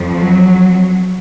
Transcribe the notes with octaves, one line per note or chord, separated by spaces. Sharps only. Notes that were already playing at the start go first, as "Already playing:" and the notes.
Already playing: F2 F3
F#3